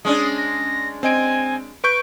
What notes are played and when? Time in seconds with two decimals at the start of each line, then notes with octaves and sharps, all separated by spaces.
0.05 G#3 C#4 D4 D#6
0.37 A#6
1.03 C4 D#5 G#5 D7
1.84 B4 C#6 G6 D7